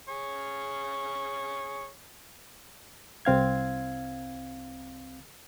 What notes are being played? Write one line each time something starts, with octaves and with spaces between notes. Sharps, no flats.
G#4 C#5
C2 C4 F5 G#6